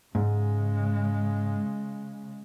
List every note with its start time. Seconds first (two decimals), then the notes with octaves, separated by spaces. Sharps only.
0.15 G#2 C#3 G#3